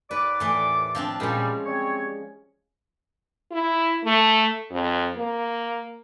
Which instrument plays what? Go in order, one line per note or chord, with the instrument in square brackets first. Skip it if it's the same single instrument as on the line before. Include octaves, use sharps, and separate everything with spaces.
[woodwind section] D#2 D5 D6 [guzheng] B4
[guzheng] A2 E3
F3 C4 D4
[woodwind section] A#2 G3 [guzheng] G#3 C#4
[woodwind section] G3 C4 C#5
[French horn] E4
A3
F2
A#3